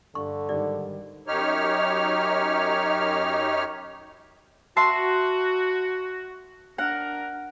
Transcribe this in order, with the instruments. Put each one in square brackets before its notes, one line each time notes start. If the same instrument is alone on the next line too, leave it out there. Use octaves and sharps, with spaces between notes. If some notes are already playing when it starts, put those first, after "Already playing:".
[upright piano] G2 [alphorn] D3 [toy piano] C#6
[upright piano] G#2 D#3 G3 [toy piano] D5
[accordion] F#2 D#4 G4 C#5 F6
[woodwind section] F#4 [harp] E5 A5 C6
[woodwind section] D4 A#4 [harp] F#5